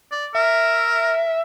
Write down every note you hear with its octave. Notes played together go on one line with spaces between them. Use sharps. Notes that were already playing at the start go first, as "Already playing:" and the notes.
D5
A#4 E5